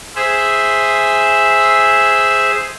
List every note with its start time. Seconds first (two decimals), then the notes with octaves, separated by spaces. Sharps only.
0.16 G#4 C5 E5